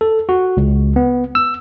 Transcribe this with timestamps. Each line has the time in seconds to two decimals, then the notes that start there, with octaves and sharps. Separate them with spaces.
0.01 A4
0.29 F#4
0.57 C#2
0.96 B3
1.35 E6